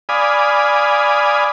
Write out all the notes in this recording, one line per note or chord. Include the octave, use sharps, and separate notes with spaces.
D5 F5 G#5 B5 D#6